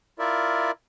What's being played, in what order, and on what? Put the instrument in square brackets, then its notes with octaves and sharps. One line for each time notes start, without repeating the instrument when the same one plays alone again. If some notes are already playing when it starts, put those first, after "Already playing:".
[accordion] E4 F4 A#4 D5 E5